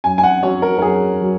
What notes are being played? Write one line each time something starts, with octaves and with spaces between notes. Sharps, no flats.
F#2 G#5
G#5
F#5
F#3 C#4 C#5
A#4
A#4
F#2 G#4
F#3